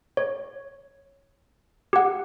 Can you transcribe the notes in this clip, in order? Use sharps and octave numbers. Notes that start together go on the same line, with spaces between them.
C#5
G4 F#5